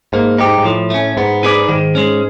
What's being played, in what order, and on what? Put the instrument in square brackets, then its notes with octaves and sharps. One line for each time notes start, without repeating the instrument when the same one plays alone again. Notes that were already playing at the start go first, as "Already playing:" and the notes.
[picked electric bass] G#2 [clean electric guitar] A#3
[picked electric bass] G#2 [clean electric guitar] D#4 G4
[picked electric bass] G#2
[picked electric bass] A2 [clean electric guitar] F3
[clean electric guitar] A3 C#4
[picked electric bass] G#2 [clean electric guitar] B3
[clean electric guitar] D#4 G#4 B4 D5
[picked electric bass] G#2 [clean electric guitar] D#3
[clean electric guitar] G#3 C#4